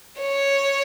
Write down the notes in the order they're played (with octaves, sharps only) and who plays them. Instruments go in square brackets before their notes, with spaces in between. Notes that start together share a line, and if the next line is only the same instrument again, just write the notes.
[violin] C#5